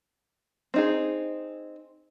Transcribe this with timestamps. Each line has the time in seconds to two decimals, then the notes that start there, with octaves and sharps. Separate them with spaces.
0.74 C4 D#4 G#4